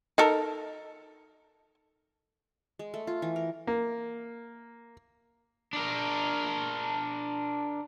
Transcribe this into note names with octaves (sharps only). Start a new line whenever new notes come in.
D#4 A4 A#4
G#3
A3
F4
E3
A#4
A#3
D4 A#4